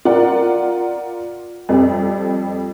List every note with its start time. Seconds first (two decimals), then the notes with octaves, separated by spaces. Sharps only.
0.05 F4 A#4 D5 F#5
1.69 F2 G3 C4